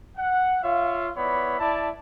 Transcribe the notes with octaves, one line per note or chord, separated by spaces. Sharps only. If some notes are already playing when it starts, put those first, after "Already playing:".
F#5
F4 C#5 E5 F5
B3 E4 C#5 D5 B5
E4 D5 A5